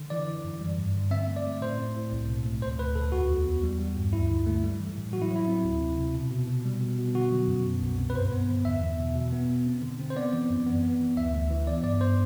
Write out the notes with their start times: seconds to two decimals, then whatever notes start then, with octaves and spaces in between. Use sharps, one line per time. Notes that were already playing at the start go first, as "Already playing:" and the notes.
Already playing: D3
0.10 E3 D5
0.28 E3
0.44 F#2
0.61 G3
0.78 G2
0.95 D3
1.11 C4 E5
1.28 A3
1.36 D5
1.45 A3
1.62 A2 C5
1.79 C4
1.96 A2
2.12 C2
2.28 B2
2.45 A3
2.62 D2 C5
2.79 D2 B4
2.95 D2 A4
3.12 E2 F#4
3.29 E2
3.46 E2
3.63 G3
3.79 G3
3.97 G2
4.13 D2 E4
4.30 D3
4.46 A3
4.64 G3
4.80 E3
4.97 A2
5.13 F#3 F#4
5.22 E4
5.31 F#3
5.36 E4
5.48 C4
5.64 D2
5.81 C3
5.98 C3
6.14 B2
6.31 B2
6.47 B2
6.65 G3
6.81 B2
6.98 B2
7.15 D3 F#4
7.31 F#3
7.48 F#2
7.65 B2
7.82 C2
7.98 C4
8.10 B4
8.15 G2 C5
8.32 B3
8.49 D3
8.65 E2 E5
8.82 E2
8.99 B2
9.15 B2
9.32 B3
9.50 B2
9.66 C4
9.82 D3
10.00 C4
10.10 C5
10.16 B3 D5
10.33 E3
10.50 F#2
10.66 B3
10.83 B3
11.01 E3
11.17 D2 E5
11.33 D2
11.51 E3
11.67 B3 D5
11.84 G2 D5
12.00 G2 C5